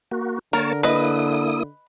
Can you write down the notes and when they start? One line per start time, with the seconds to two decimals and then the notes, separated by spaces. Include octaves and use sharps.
0.11 A#3 F#4
0.53 D3 A#3 A#4 C#5 A5
0.83 A#3 E4 B4 D#5 D#6